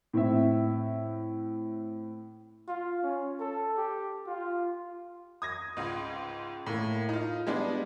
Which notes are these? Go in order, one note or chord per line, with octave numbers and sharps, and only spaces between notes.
A2 C4 E5
F4
C#4
A4
G4
F4
D#6 G#6 A#6
C#2 G#2
A2 A#3
D#4 F4
G3 G#3 B3 D4